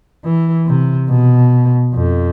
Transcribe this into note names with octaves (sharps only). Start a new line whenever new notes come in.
E3
C3
B2
F2